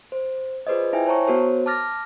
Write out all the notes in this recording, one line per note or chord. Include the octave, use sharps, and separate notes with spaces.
C5
F4 G#4 B4 C5 D5 D#5
E4 E5 G5 G#5
C5 C#5 A5 A#5 C#6
B3 F#4 A#4 C5 C#5
A5 D6 F6 A6 A#6